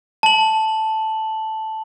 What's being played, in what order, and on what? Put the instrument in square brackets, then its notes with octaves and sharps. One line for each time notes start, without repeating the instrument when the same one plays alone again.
[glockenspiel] A5 F#7